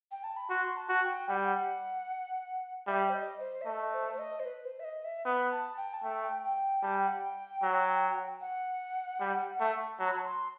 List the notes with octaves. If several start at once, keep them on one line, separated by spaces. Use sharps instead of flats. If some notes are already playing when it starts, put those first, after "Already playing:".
G5
A5
B5
F#4 C6
A5
F#4
G5
G3 F#5
G5
F#5
G3 E5
C5
D#5
C5
E5
A3 D#5
C5
C5
D#5
C5
B4
C5
E5
D#5
E5
B3
A5
G5
A5
A3 G5
G5
G3 A5
G5
F#5
G5
F#3
F#5
G3
A3
F#3 A5
B5
A5
C6